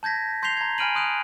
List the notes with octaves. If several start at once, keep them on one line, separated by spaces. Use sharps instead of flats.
A5 G6 G#6 A#6 B6
C6 G6 B6 C7 F7 G7
A#5 G#6
G#5 B5 F6 D7 D#7 F#7
C6 D#6 F#6 D7 F7